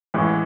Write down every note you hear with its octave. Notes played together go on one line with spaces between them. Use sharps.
A1 A2 E3 G#3